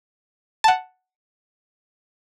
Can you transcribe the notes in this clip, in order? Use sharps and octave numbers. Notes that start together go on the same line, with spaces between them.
F#5 A5